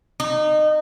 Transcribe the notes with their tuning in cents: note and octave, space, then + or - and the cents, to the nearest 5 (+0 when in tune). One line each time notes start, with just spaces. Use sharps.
D#4 -25